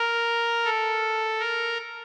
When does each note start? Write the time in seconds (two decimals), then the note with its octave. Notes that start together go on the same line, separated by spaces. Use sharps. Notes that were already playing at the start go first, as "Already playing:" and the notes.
Already playing: A#4
0.65 A4
1.39 A#4